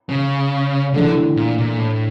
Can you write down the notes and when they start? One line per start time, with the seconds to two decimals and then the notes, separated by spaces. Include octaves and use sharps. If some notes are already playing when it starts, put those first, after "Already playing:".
0.09 C#3
0.93 D3 E3 A3 D4
1.36 A#2
1.58 A#2
1.78 A2